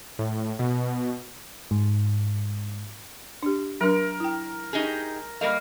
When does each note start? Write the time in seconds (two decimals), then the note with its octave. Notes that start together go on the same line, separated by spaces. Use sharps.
0.19 A2
0.59 B2
1.71 G#2
3.43 D4 G4
3.81 F#3 D4 A#4
4.20 E4 G5
4.73 D#4 G4 G#4
5.41 G3 A#3 D#5 F5 B5